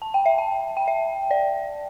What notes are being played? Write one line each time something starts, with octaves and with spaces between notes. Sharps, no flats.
A5
G5
E5
G5
G5
E5
D5